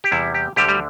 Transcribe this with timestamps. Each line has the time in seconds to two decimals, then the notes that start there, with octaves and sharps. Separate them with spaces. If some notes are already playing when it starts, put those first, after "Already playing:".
0.04 G4
0.11 E2 C3 G3 E4
0.34 G4
0.56 D2 D3 G3 G4
0.69 G3